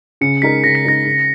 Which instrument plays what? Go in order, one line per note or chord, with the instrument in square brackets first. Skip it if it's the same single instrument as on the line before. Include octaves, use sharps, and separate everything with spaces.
[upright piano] C#3 [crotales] C#7
[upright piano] G#3 D#4 A#4 [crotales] B6
[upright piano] C#3 [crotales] A#6
[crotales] B6
[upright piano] G#3 D#4 A#4 [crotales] A#6
[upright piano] C#3